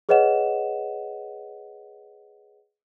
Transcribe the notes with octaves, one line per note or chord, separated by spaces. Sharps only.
G#4 B4 C#5 D#5 F#5 E7